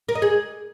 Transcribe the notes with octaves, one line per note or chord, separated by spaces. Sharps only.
A#4
D#5
G#4